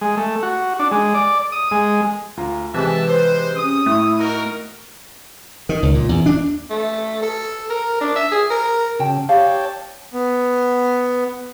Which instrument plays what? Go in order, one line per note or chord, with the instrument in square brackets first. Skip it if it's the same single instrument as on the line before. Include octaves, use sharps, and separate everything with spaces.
[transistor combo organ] G#3
A3
F#4
D4
G#3
D5
D#6
G#3
[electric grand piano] D2 F4 A#5
[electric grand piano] C3 G#3 F#6 [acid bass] E3 [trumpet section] G4 E5 A5
[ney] B4 [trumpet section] C5
[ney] C#4 [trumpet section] D#6
[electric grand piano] A2 [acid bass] A3 [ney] E4
[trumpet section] D#4 F#4 A#4
[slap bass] D#3
C#2
A#2
E2
D4
[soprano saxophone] A3
A4
A#4
D4
E5
G#4
A#4
[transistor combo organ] C#3 [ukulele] F#4 G5 A5
[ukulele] G4 D5 F5 [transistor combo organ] C#5 G5 A5
[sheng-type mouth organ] B3